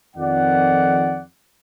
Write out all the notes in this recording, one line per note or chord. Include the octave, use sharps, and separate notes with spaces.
F2 D#3 D5 F#5